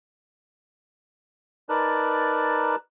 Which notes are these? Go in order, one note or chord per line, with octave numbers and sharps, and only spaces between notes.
D#4 A#4 B4 D5 A5 F#6